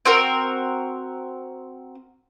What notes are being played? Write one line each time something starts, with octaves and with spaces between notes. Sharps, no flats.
C4 F#4 A#4